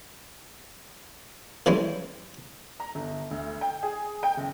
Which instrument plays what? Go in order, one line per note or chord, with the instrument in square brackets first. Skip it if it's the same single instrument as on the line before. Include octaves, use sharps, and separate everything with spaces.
[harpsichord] E3 G3 G#3 C#4 E4
[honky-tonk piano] A#5
G1
D2
G5
G#4
G5
F#1